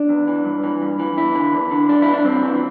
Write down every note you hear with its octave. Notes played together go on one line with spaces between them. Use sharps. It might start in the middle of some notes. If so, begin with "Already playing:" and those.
Already playing: D4
E2
E3
G2
E3
G2
E3
E2 E4
D3
E2
D3
G2 D4
E3 E4
D4
G2 C4
E3